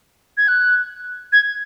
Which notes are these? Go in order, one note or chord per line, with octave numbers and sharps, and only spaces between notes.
G#6
F#6
G#6